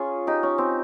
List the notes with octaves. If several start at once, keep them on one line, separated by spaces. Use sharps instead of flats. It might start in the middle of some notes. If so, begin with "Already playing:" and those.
Already playing: C#4 F4 G#4
D#4 G4
C#4
C4